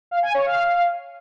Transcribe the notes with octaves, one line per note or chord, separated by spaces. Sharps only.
F5
G#5
C#5
F5